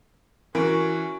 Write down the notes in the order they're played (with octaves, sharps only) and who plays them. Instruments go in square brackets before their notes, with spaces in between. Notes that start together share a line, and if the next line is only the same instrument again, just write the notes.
[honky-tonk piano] E3 [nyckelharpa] C#4 F#4 [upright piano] A#4